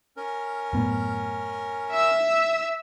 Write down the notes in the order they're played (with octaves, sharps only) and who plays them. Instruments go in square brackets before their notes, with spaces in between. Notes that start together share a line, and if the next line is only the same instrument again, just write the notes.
[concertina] C#4 A#4
[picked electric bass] F#2 A2 B3
[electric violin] E5 E6